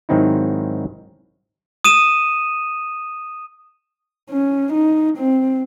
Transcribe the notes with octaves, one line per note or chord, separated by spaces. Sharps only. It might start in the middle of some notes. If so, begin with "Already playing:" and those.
G#2 D#3 F#3 C4 D#4 E4
D#6 D#7 E7
C#4
D#4
C4